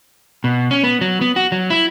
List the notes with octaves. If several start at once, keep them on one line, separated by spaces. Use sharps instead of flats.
B2
C#4
B3
F#3
B3
F#4
F#3
E4